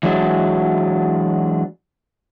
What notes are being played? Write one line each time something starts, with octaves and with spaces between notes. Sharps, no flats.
E3 F#3 G#3 D4 F#4